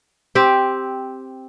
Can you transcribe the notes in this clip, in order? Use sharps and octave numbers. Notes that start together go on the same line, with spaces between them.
C4 G4